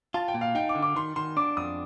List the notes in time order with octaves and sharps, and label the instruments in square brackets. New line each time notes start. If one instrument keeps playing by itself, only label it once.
[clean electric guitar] F4 [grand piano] A5
[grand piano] G5
[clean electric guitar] A#2
[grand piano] F5
[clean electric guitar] D#4 [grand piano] G5
[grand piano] D6
[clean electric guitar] D3
[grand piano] D6
[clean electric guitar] D#3 [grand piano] C6
[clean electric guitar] D#3 [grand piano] C6
[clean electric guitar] D4 [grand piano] D6
[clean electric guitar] F2 [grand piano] D#6